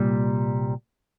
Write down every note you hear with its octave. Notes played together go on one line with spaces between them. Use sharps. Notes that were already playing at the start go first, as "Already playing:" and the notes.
Already playing: C2 A#2 G3